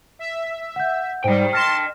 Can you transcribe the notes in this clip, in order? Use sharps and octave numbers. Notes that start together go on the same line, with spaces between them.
E5
F#5 G6
G#2 G3 C5 D#5 G5
A5 C6 F6 A#6 E7